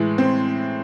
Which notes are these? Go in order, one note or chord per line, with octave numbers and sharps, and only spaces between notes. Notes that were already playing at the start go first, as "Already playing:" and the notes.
Already playing: A2 E3 G#3
C4